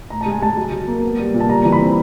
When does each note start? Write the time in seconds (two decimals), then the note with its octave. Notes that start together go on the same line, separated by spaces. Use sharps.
0.10 A2 A#5
0.21 G#3 A5
0.31 G#5
0.41 G#3 A5
0.57 F#3
0.72 F#3
0.87 A#3
1.03 B3
1.19 G3
1.34 A#2
1.40 A5
1.49 G3 A#5
1.65 E3
1.72 B5
1.80 C4